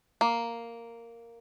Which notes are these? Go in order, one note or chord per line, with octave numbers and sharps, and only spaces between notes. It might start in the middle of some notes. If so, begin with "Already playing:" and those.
A#3